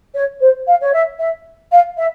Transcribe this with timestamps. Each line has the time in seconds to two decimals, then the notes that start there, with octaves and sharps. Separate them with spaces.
0.14 C#5
0.40 C5
0.67 F5
0.81 C#5
0.93 E5
1.19 E5
1.71 F5
1.97 E5